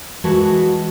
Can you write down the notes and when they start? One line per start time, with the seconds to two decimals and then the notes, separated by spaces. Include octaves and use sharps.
0.24 E3 G#3 F#4 B4 A5